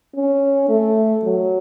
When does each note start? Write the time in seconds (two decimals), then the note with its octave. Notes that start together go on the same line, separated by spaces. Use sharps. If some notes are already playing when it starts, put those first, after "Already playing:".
0.16 C#4
0.69 A3
1.23 F#3